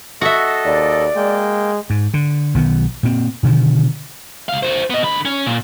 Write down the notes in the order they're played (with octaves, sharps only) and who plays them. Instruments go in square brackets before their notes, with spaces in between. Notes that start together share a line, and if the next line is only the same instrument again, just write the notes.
[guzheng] F#4 E5 [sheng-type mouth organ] A4 D#5
[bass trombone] D#2 [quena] D5
[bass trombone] G#3 [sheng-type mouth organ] A#3 G5
[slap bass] G#2
D3
B1 D#3 B3
A#2 C4
B2 D3 D#3 F3
[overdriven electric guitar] C#2 F5
F#4 C5
B3 D#5
D3 B5
C#4
A#2